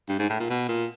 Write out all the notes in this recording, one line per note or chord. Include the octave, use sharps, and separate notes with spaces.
G2
G#2
A2
A#2
B2
A#2